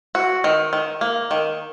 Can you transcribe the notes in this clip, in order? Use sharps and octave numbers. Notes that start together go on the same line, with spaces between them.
F#4
D#3
D#3
A#3
D#3